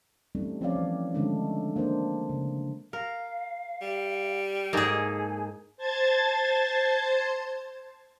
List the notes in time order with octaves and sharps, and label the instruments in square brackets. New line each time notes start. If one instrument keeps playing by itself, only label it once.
[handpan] E3 G3 A3 C4 C#4 D#4
F3 C4 C#4 C#5 D5 F5
E3
D3 D#3 G#3 A3 C#4 D4
A#3 D4 A#4 C5
C#3
[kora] A#4 [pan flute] F5
[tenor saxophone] G3
[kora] G#2 D#4 A4 [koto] A#3 G#4 [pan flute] G#5
[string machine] C5 A5 G#6 A6